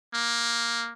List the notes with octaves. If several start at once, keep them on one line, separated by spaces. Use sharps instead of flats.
A#3